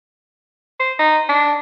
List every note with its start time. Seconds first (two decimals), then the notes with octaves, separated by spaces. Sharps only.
0.80 C5
0.99 D#4
1.29 D4